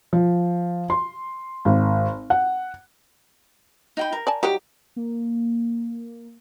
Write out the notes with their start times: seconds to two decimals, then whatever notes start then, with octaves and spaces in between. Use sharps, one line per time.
0.13 F3
0.90 C6
1.65 G#1
2.30 F#5
3.97 D#4 G5 B5
4.13 A#4
4.27 D5 G#5 A5
4.43 F#3 G3 D#4 G4
4.96 A#3